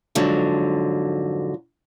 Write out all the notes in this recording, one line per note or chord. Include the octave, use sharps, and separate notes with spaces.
F2 G#2 D3 F#3